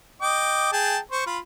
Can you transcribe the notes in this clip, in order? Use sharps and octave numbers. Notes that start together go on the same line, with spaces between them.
D#5 G5 D6
G#4 G5 A5
C5 C#6
F4 B5